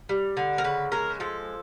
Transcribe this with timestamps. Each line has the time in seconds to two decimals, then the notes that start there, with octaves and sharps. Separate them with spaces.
0.09 G3
0.37 D3
0.58 A#4
0.64 C#3 B4
0.92 G#3 A#4
1.20 F3 A4